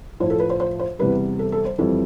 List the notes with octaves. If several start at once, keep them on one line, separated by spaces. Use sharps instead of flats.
A2 F3 C5
A4
B4
C5
C5
C5
E2 C3 G3 B4
A4
A4
C5
F2 E3 G3 A4